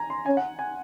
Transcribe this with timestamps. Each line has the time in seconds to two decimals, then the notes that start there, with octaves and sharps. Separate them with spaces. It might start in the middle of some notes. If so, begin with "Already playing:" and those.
Already playing: G#5 A#5
0.10 C6
0.26 C#4 G#5
0.37 F#5
0.59 G#5